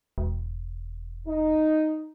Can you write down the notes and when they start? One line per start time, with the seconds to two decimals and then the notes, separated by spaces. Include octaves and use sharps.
0.18 E1
1.27 D#4